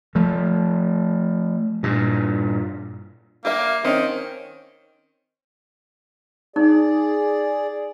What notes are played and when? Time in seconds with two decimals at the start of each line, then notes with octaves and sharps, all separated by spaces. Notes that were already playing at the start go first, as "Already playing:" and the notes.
0.15 F3 A3
1.83 G2 A#2
3.45 A#3 G4 E5
3.84 D#3 C4 C#4
6.56 D#4 G#4 D5